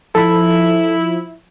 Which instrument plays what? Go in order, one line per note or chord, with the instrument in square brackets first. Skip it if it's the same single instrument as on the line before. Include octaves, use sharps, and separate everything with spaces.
[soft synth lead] F3 [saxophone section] E4 [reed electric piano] A4 B5